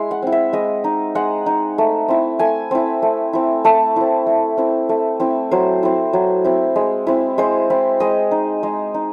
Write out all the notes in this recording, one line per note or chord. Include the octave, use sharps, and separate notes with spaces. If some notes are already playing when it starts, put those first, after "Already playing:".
Already playing: G#3 E4 C6
F#5
C4 E4
E5
G#3 D#5
D#4
G#3 F#5
D#4
A3
C4 E4
A3 G#5
C4 E4
A3
C4 E4
A3 A5
C4 E4
A3
C4 E4
A3
C4 E4
F#3 C5
C4 E4
F#3
C4 E4
G#3
C4 E4
G#3 C5
C4 E4
G#3 D#5
D#4
G#3
D#4